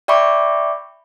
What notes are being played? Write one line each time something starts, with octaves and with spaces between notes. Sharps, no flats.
D5 E5 G5 B5 C#6 D6